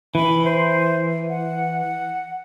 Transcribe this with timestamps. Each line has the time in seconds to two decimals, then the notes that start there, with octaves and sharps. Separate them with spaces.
0.15 E3 B5
0.45 C5
1.29 F#5